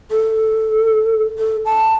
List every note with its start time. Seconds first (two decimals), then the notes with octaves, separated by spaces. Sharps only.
0.11 A4
1.39 A4
1.65 A5